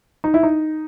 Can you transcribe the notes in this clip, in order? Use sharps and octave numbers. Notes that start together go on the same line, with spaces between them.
D#4
E4
D#4